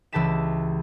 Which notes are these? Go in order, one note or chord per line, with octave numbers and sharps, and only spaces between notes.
C#2 E3 G4 A5 B6 E7